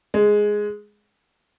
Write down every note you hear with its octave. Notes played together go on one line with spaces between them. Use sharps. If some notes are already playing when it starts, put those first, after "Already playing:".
G#3